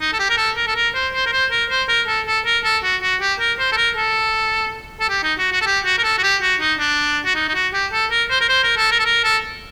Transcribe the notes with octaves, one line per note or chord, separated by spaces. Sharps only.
D#4
A4
G4
A#4
A4
A#4
A4
A#4
C5
C5
A#4
C5
A#4
C5
A#4
A4
A4
A#4
A4
F#4
F#4
G4
A#4
C5
A4
A#4
A4
A4
G4
D#4
F#4
F#4
A4
G4
F#4
A#4
A4
F#4
G4
F#4
D#4
D4
F#4
D#4
D#4
F#4
G4
A4
A#4
C5
A#4
C5
A#4
A4
A#4
A4
A#4
A4